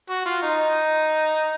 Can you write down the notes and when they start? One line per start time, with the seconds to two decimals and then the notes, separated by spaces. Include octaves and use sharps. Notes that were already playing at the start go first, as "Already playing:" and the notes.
0.10 F#4
0.26 F4
0.43 D#4